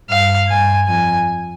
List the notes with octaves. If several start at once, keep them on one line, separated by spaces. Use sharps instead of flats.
G2 F5
G2 G#5
F2 G#5